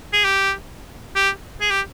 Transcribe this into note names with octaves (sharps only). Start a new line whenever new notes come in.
G#4
G4
G4
G#4
G4